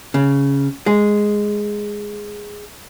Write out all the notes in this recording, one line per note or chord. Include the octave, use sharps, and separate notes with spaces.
C#3
G#3